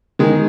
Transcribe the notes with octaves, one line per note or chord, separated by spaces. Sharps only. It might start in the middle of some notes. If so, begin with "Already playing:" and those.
D#3 G#3